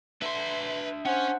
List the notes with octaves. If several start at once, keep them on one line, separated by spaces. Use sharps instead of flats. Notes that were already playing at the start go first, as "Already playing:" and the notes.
D4 B4 E5 C6
C#4 C5 F#5